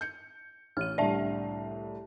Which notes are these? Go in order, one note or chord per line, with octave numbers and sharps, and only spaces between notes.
G6 C#7
A1 C#5 F6 D#7
C2 A2 D3 D5 E5 A5